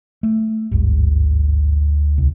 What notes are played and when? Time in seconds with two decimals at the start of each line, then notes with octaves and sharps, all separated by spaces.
0.23 A3
0.72 G#1 D2 G2
2.18 C2